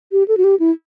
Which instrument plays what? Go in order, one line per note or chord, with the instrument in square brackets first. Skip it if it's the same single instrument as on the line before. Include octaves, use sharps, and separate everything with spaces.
[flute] G4
A4
F#4
G4
E4